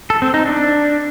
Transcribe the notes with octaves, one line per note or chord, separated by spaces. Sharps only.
A4
C4
D#4
D4